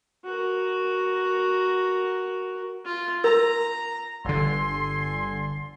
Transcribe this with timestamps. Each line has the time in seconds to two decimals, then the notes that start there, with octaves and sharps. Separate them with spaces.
0.25 F#4 A#4
2.85 F4
3.24 A#4 A#5
4.25 G1 D3 A4 G#5 C6